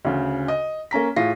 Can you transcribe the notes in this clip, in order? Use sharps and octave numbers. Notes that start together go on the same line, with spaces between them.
D2 C#3
D#5
A#3 C#4 A#5 B6
A2 F4 G#4 A#6 C7